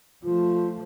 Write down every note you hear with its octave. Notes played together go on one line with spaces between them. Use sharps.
F3 A3 F4